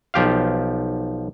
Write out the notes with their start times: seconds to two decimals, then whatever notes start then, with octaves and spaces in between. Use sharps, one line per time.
0.14 B1 F3 G4 F5